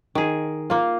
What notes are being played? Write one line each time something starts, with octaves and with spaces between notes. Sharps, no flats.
D#3 G#4
A#3 F4